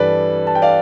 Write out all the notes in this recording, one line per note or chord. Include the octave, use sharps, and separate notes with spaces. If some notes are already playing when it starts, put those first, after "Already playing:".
Already playing: G2 E3 G3 A4 B4 D5
A5
G5
D5 F5